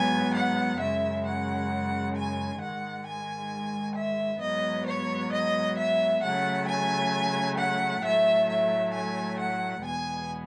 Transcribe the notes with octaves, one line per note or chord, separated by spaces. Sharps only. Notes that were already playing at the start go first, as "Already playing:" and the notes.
Already playing: G#2 F#3 B3 G#5
F#5
F#2 C#3 G#3 E5
F#5
G#5
G#2 D#3 G#3 F#5
G#5
E5
G#2 F#3 B3 D#5
C#5
D#5
E5
C#3 F#3 A3 F#5
G#5
F#5
A2 F#3 A3 E5
E5
G#5
F#5
E2 B2 G#3 B3 G#5